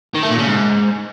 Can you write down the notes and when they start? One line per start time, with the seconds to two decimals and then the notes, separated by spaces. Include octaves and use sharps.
0.15 D#3
0.23 A3
0.31 A#2
0.39 C#3
0.46 G#2